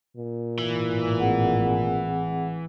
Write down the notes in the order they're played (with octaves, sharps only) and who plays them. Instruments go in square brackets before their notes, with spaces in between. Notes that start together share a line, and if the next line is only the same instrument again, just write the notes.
[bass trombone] A#2
[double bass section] G#1 A2 [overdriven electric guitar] E3
[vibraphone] C4 G#4 F#5